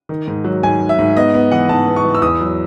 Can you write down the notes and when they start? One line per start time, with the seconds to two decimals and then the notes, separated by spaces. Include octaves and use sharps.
0.09 D#3
0.28 G#2
0.44 F#3
0.63 G#2 G#5
0.81 G#2
0.89 E5
0.99 G#2
1.17 B3 D#5
1.34 B3
1.51 E3 F#5
1.69 G#2 A5
1.87 B3
1.96 C#6
2.04 E3
2.15 E6
2.22 E2 D#6
2.41 F#3